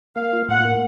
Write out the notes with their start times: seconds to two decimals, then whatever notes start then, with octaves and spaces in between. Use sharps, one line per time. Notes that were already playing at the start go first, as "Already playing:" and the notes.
0.16 A#3 F5
0.33 F4
0.48 A2 F#5
0.65 A#3